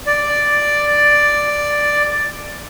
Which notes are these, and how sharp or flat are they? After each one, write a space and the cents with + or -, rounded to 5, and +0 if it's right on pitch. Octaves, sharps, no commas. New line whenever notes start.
D5 +0